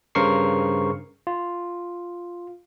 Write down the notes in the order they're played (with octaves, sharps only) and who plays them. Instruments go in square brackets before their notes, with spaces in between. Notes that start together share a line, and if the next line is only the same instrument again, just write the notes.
[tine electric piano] G2 C#3 A#4 C5 C#6 C7
F4